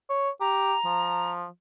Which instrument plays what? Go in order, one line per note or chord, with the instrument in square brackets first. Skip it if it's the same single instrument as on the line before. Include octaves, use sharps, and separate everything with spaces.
[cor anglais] C#5
[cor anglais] G4 [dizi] A#5
[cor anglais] F3